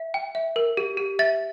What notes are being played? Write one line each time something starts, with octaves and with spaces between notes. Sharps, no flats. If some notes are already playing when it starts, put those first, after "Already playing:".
Already playing: E5
G5
E5
A#4
G4
G4
E5 A6